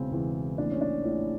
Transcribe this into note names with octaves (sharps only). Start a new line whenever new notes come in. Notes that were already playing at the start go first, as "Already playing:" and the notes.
Already playing: E1 E2 C#3 E3 C4
E1 E2 C#3 E3
A#1 A2 E3 D4
C#4
D4
A#1 A2 E3 C#4